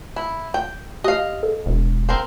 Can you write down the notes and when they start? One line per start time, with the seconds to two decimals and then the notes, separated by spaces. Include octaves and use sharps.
0.16 E4
0.54 G5
1.04 G4 D#5 F5
1.43 A4
1.66 E1
2.09 C4 A#4 C5